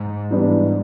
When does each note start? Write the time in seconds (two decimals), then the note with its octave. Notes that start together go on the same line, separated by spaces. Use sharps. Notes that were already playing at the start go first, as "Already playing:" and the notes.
Already playing: G#2
0.31 E3 G3 B3 D4